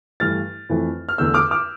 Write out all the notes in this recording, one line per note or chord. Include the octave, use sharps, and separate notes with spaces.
G2 E3 A3 F6 A6
F2 E3 A3
F6
E2 D3 A3 E6 G6
D6 F6
D6 F6